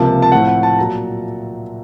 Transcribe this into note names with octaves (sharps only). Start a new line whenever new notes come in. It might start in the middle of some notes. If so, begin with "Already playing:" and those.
Already playing: C#2 C3 F3 A#3 A5
A5
A2 F3 A3 C4 F#5
F#5
A5
A#2 F#3 A#5